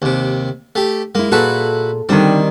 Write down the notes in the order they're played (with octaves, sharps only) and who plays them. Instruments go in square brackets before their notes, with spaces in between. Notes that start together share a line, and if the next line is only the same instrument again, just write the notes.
[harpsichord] D#2 C3
A3 G4
[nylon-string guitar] G#3 E4 [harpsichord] A#3
[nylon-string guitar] A#2 G#4 A4 [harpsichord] E4 F#4 B4
[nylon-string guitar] D3 D4 D#4 [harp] D#3 G3 [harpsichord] C4